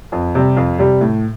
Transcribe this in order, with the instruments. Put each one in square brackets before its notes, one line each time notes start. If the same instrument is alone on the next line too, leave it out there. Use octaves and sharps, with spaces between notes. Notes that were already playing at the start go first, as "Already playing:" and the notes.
[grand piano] F2
C3 G3
F2
C3 G3
A2